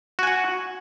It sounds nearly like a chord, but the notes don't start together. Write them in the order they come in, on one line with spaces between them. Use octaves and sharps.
F#4 G#5 F#5